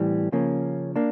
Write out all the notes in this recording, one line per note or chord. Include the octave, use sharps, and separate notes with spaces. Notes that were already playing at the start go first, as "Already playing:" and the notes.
Already playing: A2 E3 G3 C4
C#3 F3 A#3 C#4
A#3 D4